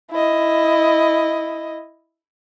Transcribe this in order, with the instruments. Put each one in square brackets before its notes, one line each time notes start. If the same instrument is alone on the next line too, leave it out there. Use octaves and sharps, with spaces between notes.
[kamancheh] E4 D#5